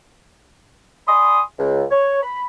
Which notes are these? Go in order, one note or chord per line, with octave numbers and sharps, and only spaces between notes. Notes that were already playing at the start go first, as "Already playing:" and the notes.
D5 G#5 B5 C6 D#6
C#2
C#5
B5